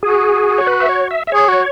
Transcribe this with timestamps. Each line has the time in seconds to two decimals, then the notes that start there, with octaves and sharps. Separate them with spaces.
0.02 F#4 G#4
0.58 C#5
0.67 B4
0.80 E5
0.89 C#5
1.11 E5
1.27 E5
1.32 G#4 C#5
1.48 F#4